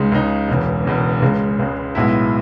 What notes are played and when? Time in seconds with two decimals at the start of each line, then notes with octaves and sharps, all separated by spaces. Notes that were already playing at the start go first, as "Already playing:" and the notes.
Already playing: C#2 C#3 G#3 D#4
0.12 C#2 C#3 G#3 D#4
0.48 E1 E2 C#3
0.85 E1 E2 C#3
1.22 C#2 C#3 G#3
1.59 C#2 C#3 G#3
1.95 B1 A2 G#3 B3 E4